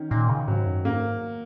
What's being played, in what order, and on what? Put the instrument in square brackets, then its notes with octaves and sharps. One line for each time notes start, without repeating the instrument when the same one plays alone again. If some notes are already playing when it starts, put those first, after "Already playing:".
Already playing: [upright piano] D#3 C#4
[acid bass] A#2 [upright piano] D#3
[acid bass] C#3
[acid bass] G#2 [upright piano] F#3
[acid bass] F#2
[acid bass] G#2 [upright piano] A#3